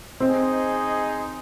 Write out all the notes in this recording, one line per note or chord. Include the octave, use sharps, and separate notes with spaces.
C4 D#4 G#4 C5 D#5